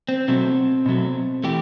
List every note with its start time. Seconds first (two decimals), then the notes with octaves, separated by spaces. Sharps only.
0.09 C4
0.28 B2 F#3 A3 C4
0.86 B2 F#3 A3
1.44 E3 A3 G4